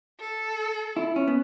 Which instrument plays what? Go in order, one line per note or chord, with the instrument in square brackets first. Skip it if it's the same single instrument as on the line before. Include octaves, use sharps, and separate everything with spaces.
[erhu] A4
[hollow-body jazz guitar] E4
C#4
B3